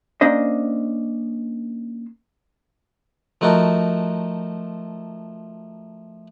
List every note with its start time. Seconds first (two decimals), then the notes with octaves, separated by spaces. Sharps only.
0.21 A#3 C#4 D4 C5 D#5
3.41 F3 A3 D#4 F#4 A4 A#4